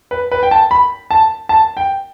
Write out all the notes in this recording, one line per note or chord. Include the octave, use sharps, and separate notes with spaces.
B4
B4
G5
A5
B5
A5
A5
G5